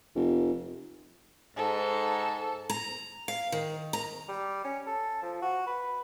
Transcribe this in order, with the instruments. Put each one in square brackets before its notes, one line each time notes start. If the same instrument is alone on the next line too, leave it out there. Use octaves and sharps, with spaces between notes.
[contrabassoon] F1
[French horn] G#2 [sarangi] A4
[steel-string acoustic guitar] A#5
F5
D#3
A#5
[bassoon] G3
C#4
A4
F3
F#4
B4